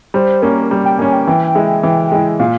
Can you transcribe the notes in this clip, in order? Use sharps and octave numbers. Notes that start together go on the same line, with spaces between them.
G3 C5
A#3 C#4 A#4
G3
G5
A#3 C#4 G#5
G5
E3
G#3 E4
E3
G#3 E4
A#2 F5